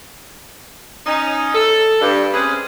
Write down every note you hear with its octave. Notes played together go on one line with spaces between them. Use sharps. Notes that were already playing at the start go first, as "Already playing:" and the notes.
C#4 D#4
A4
G2
G#3 C4 C#4 G#4 B4